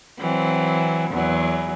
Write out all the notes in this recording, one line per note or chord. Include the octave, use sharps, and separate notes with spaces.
E3 F#3 C4
E2 F#3